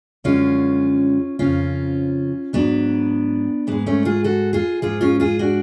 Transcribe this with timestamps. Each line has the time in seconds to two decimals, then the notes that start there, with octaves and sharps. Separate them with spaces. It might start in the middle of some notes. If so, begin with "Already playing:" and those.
0.24 F#2 D3 F3 G#3 C#4 F4
1.39 F2 C#3 F3 C#4 F4
2.53 G#2 F#3 B3 D4
3.67 G#2 G#3 B3
3.86 A3 C#4
4.05 F4 G#4
4.24 F#4 A4
4.53 F4 G#4
4.82 G#2 F3 G#3 F4 G#4
5.01 C#4 F4
5.20 F4 G#4
5.39 D4 F#4